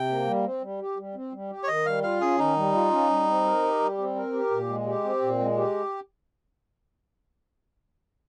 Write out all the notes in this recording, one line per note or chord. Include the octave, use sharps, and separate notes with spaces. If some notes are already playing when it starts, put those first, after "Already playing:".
Already playing: C3 G5
A#3
G3
C4
G3
G4
G3
C4
G3
G4
C#5
D#3 D#5
G3 F5
F4 F5
C#4 G#4
D#3 D#4
G3
F4
C#4
G3
C4
A#4
G4
G3
C4
A#4
G4
A#2
G#3
G4
C4
A#2
G#3
G4